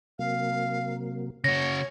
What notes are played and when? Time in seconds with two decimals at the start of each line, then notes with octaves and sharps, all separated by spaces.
0.19 C3 F#3 A#3 F5
1.44 C#3 F#4 C#5 A#6